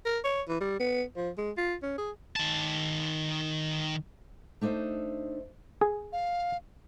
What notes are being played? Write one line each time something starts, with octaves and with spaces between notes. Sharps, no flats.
A#4
C#5
E3
G3
B3
F3
G#3
F4
C#4
G#4
D#3 A5
A3 D4 D#4 C5 E5
G#4
F5